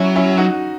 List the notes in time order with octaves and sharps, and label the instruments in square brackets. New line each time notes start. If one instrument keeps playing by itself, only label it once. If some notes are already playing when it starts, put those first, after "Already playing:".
Already playing: [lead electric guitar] F#3 [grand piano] C#4 E4
[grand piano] C#4 E4
D#4 F#4